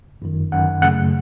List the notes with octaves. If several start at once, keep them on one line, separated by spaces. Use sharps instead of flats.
G1 F#2 D#3
G1 F#2 D#3 F#5
F#2 C#3 F#3 A3 F#5